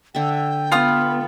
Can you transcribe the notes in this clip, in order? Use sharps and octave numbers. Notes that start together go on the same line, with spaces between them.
D3 E5 G5
B3 F4 D#6 F6